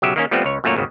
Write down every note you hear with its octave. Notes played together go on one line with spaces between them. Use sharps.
B1 C#3 F#3 G4 E5
D#3 A#3 C#4
F3 G3 A3 B3 C4
C#2 C#5
F#2 A#2 A3 A#3 C#5
G#1 D#2 C#3